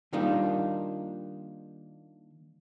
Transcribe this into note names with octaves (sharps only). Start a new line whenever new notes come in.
D#3 G3 A#3 D4 D#4 F4